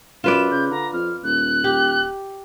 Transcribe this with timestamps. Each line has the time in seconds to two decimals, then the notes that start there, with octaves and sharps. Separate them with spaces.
0.24 F#2 F4 B4 D5 E7
0.51 C#3 G6
0.71 D3 A#5
0.93 F2 F6
1.23 D#1 F#6
1.64 G4